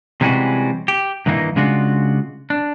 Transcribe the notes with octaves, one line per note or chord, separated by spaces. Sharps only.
C3 E3 G3 G#3 C#4 F#4
G4
G2 D#3 E3 A#3 D#4
C#3 G#3 D4 F4 F#4
D4